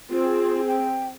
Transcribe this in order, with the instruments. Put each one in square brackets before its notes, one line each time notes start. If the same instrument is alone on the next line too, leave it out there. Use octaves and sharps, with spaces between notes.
[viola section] C4 G#4 [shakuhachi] F4
[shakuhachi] G5